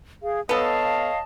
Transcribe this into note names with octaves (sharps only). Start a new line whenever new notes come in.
G#4 F5
B3 A4 C#5 D#5 F5 A5